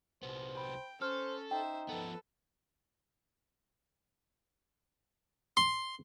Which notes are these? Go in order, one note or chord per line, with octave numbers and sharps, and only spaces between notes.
C2 B3 C5
G5 B5
C#4 A4 C5 F6
D#4 C5 E5 G5
F3 B3 A4 B4
C6